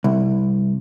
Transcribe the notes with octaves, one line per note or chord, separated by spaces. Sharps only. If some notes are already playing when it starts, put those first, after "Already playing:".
C2